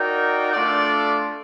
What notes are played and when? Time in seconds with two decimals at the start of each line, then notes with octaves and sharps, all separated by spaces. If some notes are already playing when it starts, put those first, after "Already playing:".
Already playing: D#4 F#4 A#4 D5 G5
0.54 A3 D4 F4 A4 D5